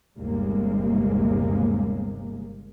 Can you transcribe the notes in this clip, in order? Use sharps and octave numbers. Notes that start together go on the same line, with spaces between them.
G1 D#2 C3 G3 G#3 A#3